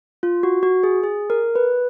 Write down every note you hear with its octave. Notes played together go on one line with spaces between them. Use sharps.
F4
F#4
F#4
G#4
G#4
A#4
B4